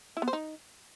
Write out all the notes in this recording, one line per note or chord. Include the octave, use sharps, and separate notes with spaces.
E4
B3
C5
D#4